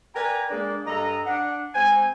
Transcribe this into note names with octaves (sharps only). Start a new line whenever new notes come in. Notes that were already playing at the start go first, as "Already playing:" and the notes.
A#4 B4 D5 G5 G#5 A#5
G#3 A#3 D4 G#4 D5
G2 A4 D#5 A#5
D4 F#5
G#3 C4 C5 G#5